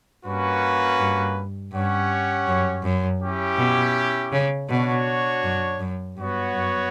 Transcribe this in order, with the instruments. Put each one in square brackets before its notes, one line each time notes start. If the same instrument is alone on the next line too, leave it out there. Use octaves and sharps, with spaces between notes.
[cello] G2 [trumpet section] A#3 C#4 F#4 B4
[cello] G2
[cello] G2 [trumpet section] C#4 G4 C#5 F#5
[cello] F#2
F#2
[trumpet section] C#4 E4 G4
[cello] B2
C#3
[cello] B2 [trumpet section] D4 F#4 C#5
[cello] F#2
F#2
[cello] G2 [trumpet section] B3 F#4 C#5
[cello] F#2